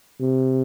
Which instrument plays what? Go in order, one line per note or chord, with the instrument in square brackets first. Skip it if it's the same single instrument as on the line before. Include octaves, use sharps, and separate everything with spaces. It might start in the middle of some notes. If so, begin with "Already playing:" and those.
[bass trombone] C3